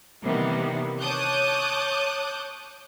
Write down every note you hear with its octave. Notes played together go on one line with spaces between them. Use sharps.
C3 D#3 E3 G3 A#3 B3
C#5 A5 D6 D#6 F#6 G6